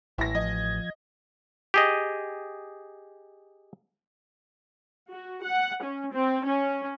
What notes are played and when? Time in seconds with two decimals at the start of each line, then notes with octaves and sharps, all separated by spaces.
0.18 A1 E4 A#6
0.35 F3 D#5 G#6
1.74 G4 G#4 D#5
5.10 F#4
5.43 F#5
5.83 C#4
6.12 C4
6.45 C#4